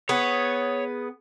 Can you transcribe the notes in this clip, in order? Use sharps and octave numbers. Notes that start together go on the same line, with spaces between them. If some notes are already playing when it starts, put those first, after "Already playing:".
B3 G#4 C#5